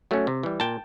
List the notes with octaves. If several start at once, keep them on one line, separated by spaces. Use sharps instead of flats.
F#3 A3 C#4
C3
E3 G3
A#2 G5 A5